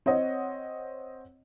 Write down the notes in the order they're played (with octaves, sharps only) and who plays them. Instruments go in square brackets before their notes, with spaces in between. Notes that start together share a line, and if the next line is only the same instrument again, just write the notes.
[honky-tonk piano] C4 C#5 D#5 F#5